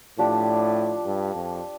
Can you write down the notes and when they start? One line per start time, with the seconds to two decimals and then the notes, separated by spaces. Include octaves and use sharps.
0.18 A2 F3 D4 G4
1.06 G2
1.35 F2